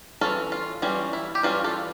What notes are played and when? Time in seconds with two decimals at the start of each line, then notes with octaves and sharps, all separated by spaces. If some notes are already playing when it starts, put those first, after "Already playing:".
0.21 E3 G3 C#4 F4 A4
0.52 F4
0.82 E3 G3 C#4 F4
1.13 E4
1.35 G4
1.43 E3 G3 C#4 F4
1.64 F4 A4